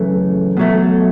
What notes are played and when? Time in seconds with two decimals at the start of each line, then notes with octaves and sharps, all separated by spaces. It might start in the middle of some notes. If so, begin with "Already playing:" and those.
Already playing: F#2 C#3 E3 A3
0.57 B2 F#3 A3